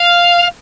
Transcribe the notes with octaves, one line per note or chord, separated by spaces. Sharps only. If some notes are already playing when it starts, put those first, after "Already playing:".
Already playing: F5